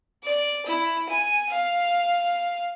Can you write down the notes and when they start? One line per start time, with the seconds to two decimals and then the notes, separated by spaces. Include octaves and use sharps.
0.23 D5
0.66 E4
1.09 G#5
1.50 F5